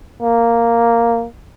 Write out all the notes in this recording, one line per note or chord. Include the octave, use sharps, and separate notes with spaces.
A#3